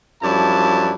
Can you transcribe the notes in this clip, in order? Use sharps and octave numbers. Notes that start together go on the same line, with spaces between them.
F#2 F3 G3 D4 E4 A5